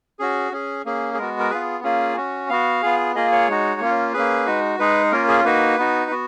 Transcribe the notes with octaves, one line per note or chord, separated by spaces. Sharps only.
C#4 F#4 G#4
C#4 G#4
A#3 C#4 G#4
G#4
G#3 B3 F#4 A#4
A#4
B3 F4 G#4 B4
A#3 C#4 F4 G#4
C#4 F#4
B3 F#4 F5
B3 F4 G#4
A#3 F4 G#4 D#5
C#5
G#3 D#4 F#4
A#3 C#4 F4
A#3 C#4 G#4 B4
G#3 D#4 F#4
G#3 D#4 G#4 B4
A#3 C#4 F4 A#4
G#4
A#3 D#4 F#4 B4
B3 D#4 F#4
B3 F#4